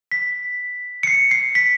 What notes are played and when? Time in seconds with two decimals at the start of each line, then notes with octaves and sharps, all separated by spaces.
0.11 B6
1.03 C#7
1.07 C7
1.31 C7
1.55 B6